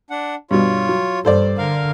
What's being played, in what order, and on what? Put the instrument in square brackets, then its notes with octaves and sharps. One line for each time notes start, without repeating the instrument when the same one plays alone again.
[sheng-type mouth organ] D4 F#5
[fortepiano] G2 B2 [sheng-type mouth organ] F4 C#5
[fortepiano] F#3
[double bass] G2 [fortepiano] A4 C5 D5
[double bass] D3 [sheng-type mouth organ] A#4 F5